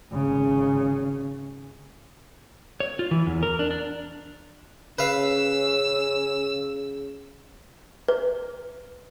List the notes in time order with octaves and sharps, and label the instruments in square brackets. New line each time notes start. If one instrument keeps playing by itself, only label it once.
[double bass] G#1 C#3
[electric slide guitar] C#5
F4
E3
E2
A#4
D4
D4
[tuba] C#3 [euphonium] C#4 [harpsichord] B4 F5 [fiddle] E6
[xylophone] B4